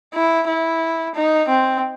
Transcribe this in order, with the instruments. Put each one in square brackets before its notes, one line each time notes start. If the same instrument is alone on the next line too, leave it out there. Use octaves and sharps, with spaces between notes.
[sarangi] E4
E4
D#4
C4